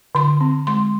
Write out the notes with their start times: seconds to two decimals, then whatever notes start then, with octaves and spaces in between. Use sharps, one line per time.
0.15 D3 C6
0.41 C4
0.67 G#3 C6